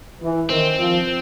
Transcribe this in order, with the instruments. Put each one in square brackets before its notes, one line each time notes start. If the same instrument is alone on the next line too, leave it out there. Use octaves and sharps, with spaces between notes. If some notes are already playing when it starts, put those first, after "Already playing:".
[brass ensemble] E3
[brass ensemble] D#3 [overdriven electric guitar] C4
[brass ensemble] F3